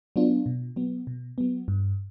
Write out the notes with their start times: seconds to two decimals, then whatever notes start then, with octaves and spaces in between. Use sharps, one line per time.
0.16 F#3 B3 D4 F4
0.46 B2
0.76 F#3 B3
1.07 B2
1.38 F#3 B3
1.68 G2